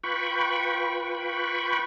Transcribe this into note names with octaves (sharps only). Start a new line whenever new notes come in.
F4 B4 G5 B5 C#6